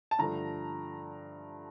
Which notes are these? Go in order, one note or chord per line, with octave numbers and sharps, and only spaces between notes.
A5
G2 D3 F3 A3 A#5